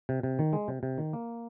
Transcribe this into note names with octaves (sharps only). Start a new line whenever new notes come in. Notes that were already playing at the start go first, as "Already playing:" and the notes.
C3
C3
D#3
G#3
C3
C3
D#3
A#3